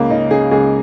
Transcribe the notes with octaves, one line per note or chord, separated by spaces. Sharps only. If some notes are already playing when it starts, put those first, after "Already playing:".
Already playing: C#2 C#3 A#3
C#3 D#4
C#3 G#4
C#2 G#4